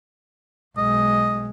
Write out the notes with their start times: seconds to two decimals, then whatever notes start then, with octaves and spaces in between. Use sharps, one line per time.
0.78 B1 G#3 D#5